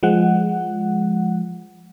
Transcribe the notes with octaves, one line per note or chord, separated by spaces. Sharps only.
F3 G#3 F#5